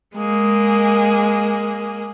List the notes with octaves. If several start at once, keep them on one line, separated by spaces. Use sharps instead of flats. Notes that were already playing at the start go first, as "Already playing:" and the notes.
G#3 A#3 G#4